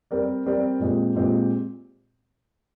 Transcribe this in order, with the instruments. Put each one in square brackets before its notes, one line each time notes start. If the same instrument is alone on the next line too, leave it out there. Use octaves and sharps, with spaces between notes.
[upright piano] G3 C4 G4 A#4 D5
G3 C4 G4 A#4 D5
A#2 G#3 C4 G4
A#2 G#3 C4 G4